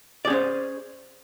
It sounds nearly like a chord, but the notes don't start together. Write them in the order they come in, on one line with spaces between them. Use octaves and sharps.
D5 G#4 C#4 C5